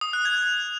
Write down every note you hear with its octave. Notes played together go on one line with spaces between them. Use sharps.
D#6
F#6
G#6